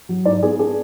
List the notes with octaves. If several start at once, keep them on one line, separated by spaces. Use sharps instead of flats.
F#3
G#2 D5
B3 G#4
D4 G#4